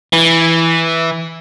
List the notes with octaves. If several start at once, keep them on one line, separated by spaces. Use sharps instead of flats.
E3